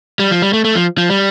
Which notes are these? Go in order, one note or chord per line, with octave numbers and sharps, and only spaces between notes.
G3
F3
G3
A3
A3
F3
F3
G3